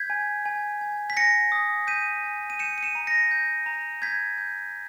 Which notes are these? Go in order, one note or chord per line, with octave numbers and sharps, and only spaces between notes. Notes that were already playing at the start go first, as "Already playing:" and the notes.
Already playing: G6 G#6 B6
G#5
G#5
G#5
B6
G#5 A#6 C#7
D#6
G6 B6 D#7
G#5
D#7
G6 C#7 E7
D#7
C#7 E7
A#5
A#6 C#7
G6
A#5
G6 G#6 B6
G6